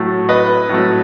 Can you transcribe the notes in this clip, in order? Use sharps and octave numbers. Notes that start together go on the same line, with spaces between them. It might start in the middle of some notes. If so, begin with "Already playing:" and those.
Already playing: A2 F#3 A3
B4 D#5
A2 F#3 A3